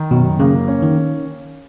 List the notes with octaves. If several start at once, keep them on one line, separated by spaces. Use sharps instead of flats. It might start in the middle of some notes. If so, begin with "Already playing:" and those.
Already playing: D#3
F#2 B2
C#3 A#3
C#4
D#3